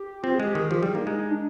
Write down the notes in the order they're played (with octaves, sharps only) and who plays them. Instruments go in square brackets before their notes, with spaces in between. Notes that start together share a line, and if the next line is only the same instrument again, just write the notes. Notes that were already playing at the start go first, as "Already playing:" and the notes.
Already playing: [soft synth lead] G4
[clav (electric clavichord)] C4 [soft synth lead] F4
[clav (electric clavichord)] G#3 [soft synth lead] G#4
[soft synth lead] G4
[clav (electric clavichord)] D#3 [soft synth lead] G#4
[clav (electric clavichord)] F3 [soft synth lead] G4
[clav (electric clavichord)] G3 [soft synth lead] G#4
[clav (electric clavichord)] A#3 [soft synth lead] D#4
[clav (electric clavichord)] G#3 [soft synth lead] D#4
[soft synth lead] D#4
D4